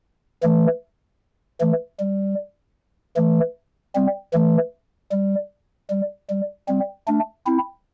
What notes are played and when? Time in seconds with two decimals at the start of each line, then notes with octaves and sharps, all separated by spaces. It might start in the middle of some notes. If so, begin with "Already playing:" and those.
0.43 E3 A3
1.61 E3 A3
2.00 G3
3.16 E3 A3
3.95 G3 C4
4.34 E3 A3
5.12 G3
5.90 G3
6.30 G3
6.68 G3 C4
7.07 A3 D4
7.46 C4 E4